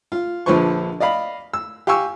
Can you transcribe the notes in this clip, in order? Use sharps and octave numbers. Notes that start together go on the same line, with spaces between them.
F4
A#1 D3 F3 B4 C5 C#6
D5 D#5 F5 B5
E6
G4 F5 G#5 C#6 E6